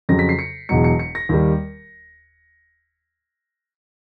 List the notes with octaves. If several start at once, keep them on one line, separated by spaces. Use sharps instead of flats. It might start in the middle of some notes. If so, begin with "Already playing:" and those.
F2 C#3 F#3 A#6
B6
C7
C#7
E1 E2 B2 F#3 C#7
C#7
C#7
A#6
D#2 D#3 G3